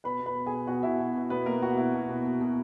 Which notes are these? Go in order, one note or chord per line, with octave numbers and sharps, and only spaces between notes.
B2 B4 B5
B2
B4 B5
B2
B2 G#4 G#5
B2 F#4 F#5
B2 E4 E5
B2
B2
B2 B3 B4
B2 A#3 A#4
B2 F#4
B2 E4
B2
B2
B2
B2